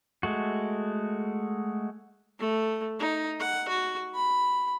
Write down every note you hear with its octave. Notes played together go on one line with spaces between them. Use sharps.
G#3 A3 F#4
A3
D#4
F#5
F#4
B5